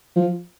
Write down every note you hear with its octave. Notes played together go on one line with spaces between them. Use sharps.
F3